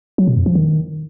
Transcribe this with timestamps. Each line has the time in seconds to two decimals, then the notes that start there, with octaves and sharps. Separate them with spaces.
0.18 F#3
0.28 B2
0.37 F2
0.46 F3
0.55 D#3